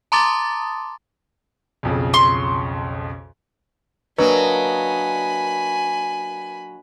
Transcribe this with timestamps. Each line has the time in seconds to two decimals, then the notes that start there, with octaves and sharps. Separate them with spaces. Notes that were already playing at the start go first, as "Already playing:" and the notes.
0.12 A5 A#5 C6 D6 D#6 A6
1.83 B1 F2 C#3
2.13 C6 C#6
4.18 F#3 A#3 D4 B4 D#5 G#5 B5